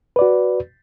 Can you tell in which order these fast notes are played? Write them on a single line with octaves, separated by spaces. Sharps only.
B4 D5 F#4